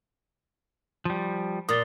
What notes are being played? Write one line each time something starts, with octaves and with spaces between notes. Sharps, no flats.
F3 G3
A#2 D#6 A6 G7